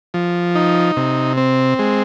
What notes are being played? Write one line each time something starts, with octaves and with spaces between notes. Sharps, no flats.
F3
D#4
C3
C4
G#3